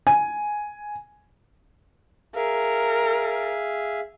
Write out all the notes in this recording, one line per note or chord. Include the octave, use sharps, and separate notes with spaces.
G#5
G#4 A#4 E5 F5